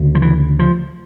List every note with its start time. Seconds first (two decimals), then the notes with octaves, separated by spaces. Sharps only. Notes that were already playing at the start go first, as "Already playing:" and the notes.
Already playing: D2 C#3
0.15 F3
0.22 E3
0.59 F3